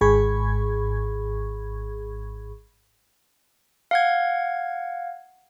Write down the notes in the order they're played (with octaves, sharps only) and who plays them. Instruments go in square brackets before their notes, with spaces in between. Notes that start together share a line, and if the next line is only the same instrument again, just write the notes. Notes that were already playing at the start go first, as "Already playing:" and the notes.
[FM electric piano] G#1 G#2 G#4 B5 C#6 G#6
[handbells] F5 F#5 G#6